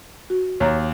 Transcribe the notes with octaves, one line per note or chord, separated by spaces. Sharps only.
F#4
D#2 C#5 A#5